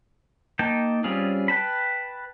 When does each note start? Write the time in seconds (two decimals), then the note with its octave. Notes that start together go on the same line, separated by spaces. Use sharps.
0.59 A#3 D#4 G5 A5
1.04 G3 C4 C#4 F4 G#4
1.48 B4 G5 A5 B5